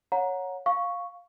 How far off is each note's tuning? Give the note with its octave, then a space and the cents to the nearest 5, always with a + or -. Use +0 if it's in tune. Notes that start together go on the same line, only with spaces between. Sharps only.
C#5 +0 F#5 -20 A#5 +10
F5 +10 C#6 +0